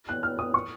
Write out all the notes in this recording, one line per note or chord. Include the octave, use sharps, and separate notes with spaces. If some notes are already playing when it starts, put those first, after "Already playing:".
F#6
F6
D#6
C#6